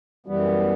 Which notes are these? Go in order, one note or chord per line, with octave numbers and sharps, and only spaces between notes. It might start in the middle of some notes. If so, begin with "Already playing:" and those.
F#2 E3 G3 B3